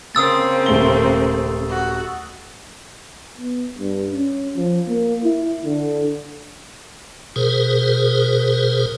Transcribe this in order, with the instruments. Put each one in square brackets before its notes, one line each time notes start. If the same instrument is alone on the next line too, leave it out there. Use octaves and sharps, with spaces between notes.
[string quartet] C#3 A#3 C4 [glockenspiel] D#6 E6 A6
[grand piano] D#1 A3 G7
[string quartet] F#4
[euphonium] B3
G2
C#4
F3
A#3
E4
D3
[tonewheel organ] B2 G#4 A#4 C5